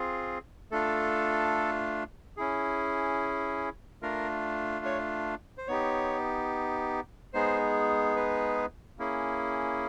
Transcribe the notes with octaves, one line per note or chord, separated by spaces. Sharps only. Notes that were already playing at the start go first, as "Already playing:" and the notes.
Already playing: C4 F4 G#4
A3 D4 F4 A4
C#4 E4 G#4
A3 D4 F4 A#4
C#5
C5
B3 D#4 G4 C#5
G#3 B3 D#4 G#4 C5
B4
A#3 C#4 E4 G#4